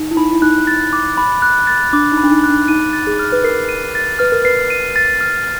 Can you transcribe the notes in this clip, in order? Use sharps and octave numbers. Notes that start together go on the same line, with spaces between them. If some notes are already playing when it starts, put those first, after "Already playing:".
Already playing: D#4
E4
D#4 B5
E4
D#4 F#6
A6
D6
B5
F#6
A6
D4 D6
D#4
B5
D4
D#4
F#6
D4
D#4 D#7
A6
G#4
F6
B4
A#4 C7
D#7
A6
B4 F6
A#4
B4 C7
D#7
A6
F6